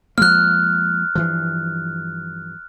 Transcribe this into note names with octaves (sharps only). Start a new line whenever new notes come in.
F3 G#3 A#3 F6 F#6
G2 E3 F3